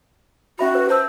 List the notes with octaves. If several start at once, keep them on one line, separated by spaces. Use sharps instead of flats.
C#4 F#4 E5 B5
B4
C5 F#5 A5 E6